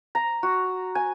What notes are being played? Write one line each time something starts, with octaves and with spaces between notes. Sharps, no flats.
A#5
F#4
G#5